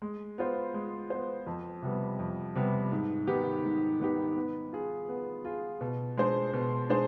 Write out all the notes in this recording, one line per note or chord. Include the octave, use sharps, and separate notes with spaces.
G#3
B3 F4 C5
G#3
B3 F4 C5
F2
C3 G3 B3
F2
C3 G3 B3
G#2
D#3 B3 D#4 G4
G#2
D#3 B3 D#4 G4
B3
F4 G#4
B3
F4 G#4
B2
G#3 D4 G#4 C5
B2
G#3 D4 G#4 C5